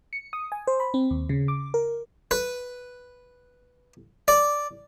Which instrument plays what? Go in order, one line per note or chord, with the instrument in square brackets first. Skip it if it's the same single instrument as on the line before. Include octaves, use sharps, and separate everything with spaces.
[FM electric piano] C#7
D#6
G#5
C5
B5
C4
D#2
C#3
D6
A#4
[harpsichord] B4
D5